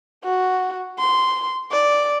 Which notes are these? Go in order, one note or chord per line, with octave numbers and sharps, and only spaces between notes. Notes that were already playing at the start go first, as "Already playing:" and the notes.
F#4
C6
D5